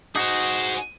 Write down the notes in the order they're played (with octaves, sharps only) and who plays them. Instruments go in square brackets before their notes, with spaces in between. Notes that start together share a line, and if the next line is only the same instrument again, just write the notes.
[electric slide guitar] D#4 F#4 [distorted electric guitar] G#4 C5